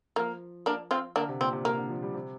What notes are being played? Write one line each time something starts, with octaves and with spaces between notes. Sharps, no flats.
F3 A#3
A#3 D4
C4 F4
D3 A#3 D4
C3
A#2 C4
C3
C3 A#3
D3
F3
G3
C3